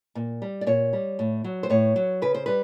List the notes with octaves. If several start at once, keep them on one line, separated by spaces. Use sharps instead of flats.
A#2
G3
D5
A#2 C#5
G3
A2
F#3
C5
A2 C#5
F#3
C#3 B4
C5
G3 B4